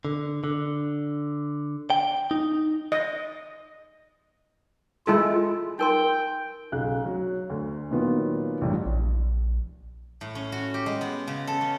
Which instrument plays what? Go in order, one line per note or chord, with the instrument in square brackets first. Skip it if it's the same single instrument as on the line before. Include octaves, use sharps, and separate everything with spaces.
[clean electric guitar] D3
D3
G5
D#4
[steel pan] D#5
[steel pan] G#3 E4 A4 [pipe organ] F4
[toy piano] D#4 A#4 C6 [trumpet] G5
[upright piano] B1 C#3 F5 F#6
F#3
D2
A#2 D#3 F#3 B3 F4
A1 G2
[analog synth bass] A#1
[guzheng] A2
C#4
F#4
G4
G#3
B3
C#3
A4
C#4